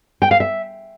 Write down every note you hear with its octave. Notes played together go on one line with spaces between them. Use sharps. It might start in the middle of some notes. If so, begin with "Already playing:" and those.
G5
F5
E5